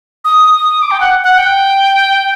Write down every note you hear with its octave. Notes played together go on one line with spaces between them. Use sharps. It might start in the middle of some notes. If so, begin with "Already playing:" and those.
D#6
D6
G5
F#5
F#5
G5